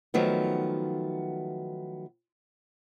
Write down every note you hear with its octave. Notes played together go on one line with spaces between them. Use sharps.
D#3 F3 F#3 A3 B3